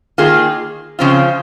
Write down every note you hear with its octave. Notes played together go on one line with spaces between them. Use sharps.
D#3 A#3 F4 G#4
C#3 F3 C4 F4